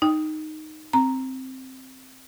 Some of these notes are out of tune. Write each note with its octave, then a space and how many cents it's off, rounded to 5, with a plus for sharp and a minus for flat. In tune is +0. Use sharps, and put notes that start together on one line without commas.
D#4 -5 G5 +0
C4 +0 A#5 +0